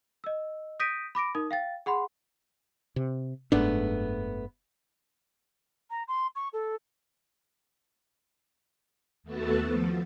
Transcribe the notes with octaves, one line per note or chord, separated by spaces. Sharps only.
D#5 E6
D#6 G6 A#6 B6 D7 D#7
B5 D6 A#6 D7
D#4 A#4 D#6
F5 G5 A6
G#4 F#5 B5 C6
C3
F#1 G#2 A3 B3 D4
A#5
C6
C#6
A4
D#2 A3 B3 F#4 A4 A5
F3